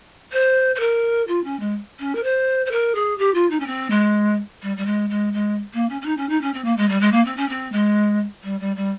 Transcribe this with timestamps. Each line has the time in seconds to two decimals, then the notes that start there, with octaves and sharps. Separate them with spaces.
0.32 C5
0.75 C5
0.80 A#4
1.28 F4
1.44 C#4
1.60 G#3
1.99 C#4
2.15 A#4
2.23 C5
2.66 C5
2.71 A#4
2.95 G#4
3.18 G4
3.34 F4
3.50 D#4
3.60 C#4
3.66 C4
3.90 G#3
4.62 G3
4.77 G3
4.86 G#3
5.10 G#3
5.33 G#3
5.73 A#3
5.89 C#4
6.01 C#4
6.05 D#4
6.17 C#4
6.29 D#4
6.42 C#4
6.53 C4
6.64 A#3
6.77 G#3
6.89 G3
7.01 G#3
7.12 A#3
7.25 C4
7.37 C#4
7.49 C4
7.72 G#3
8.43 G3
8.60 G3
8.76 G3